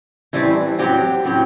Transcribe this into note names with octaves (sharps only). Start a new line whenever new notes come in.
A2 E3 G3 C4
A2 F#3 C4 G4
A2 F#3 C4 G4